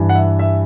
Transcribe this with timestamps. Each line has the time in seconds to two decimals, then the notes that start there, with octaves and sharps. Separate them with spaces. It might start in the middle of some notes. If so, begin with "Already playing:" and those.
Already playing: G2 E3 G3
0.09 F#5
0.15 E5
0.39 E5